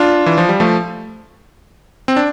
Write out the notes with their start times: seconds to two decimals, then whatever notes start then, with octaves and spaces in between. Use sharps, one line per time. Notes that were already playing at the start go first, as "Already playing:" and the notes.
Already playing: D4 F4
0.26 E3
0.38 F3
0.49 G3
0.60 F3 A3
2.08 C4
2.16 D4